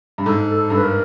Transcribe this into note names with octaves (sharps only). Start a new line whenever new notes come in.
G2
G#2 A4
A4
G2
B4
A#4